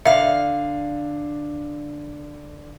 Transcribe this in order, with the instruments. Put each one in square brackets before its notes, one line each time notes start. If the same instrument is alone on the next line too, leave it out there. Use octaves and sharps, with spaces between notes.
[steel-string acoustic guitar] D3 F5 [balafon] E5